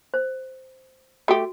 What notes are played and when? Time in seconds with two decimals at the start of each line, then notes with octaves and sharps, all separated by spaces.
0.14 C5
1.28 A3 F#4 G4